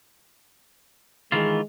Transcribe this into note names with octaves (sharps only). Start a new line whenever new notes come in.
D#3 E3 G#3 F4